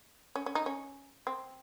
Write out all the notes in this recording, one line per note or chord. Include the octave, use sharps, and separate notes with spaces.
C#4
C#4
D#4
C#4
C4